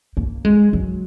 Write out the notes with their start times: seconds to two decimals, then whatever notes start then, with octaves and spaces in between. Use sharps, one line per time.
0.17 A#3
0.45 G#3
0.73 F#3